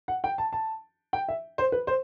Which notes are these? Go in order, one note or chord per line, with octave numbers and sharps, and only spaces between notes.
F#5
G5
A5
A5
G5
E5
C5
B4
C5